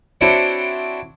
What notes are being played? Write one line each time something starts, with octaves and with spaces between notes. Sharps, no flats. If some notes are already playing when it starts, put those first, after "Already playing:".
C4 D4 E4 F#4 C5 C#5